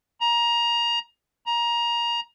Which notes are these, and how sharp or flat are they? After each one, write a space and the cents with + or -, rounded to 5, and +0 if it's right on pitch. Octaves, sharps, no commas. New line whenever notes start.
A#5 +20
A#5 +20